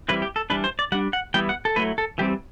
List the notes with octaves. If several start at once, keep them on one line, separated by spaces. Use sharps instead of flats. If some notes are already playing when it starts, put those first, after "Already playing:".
E3 G3 C4 E4 B4
G4
A4
E3 G3 D4 B4
C5
D5
G3 D4 F#5
F#5
E3 G3 B3 E4 G5
F#5
A4
F#3 A3 E4 B4
A4
E3 G3 C4 G4